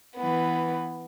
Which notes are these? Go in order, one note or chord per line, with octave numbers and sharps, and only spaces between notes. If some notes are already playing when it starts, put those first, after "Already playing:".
E3 B3